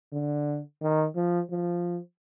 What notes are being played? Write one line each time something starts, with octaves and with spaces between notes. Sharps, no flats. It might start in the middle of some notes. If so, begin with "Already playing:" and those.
D3
D#3
F3
F3